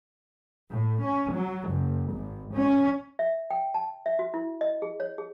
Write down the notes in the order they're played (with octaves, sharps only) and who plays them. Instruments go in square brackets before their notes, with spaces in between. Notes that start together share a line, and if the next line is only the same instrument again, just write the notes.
[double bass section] A2
C#4
F#3
F#1
G#1
C#4
[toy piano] E5
G5
A5
E5
F#4
E4
D#5
G#4
C#5
G#4